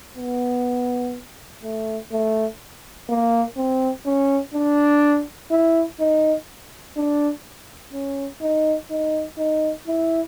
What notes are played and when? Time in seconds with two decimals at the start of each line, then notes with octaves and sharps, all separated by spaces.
0.18 B3
1.64 A3
2.12 A3
3.09 A#3
3.57 C4
4.06 C#4
4.54 D4
5.51 E4
6.00 D#4
6.97 D4
7.93 C#4
8.42 D#4
8.91 D#4
9.38 D#4
9.88 E4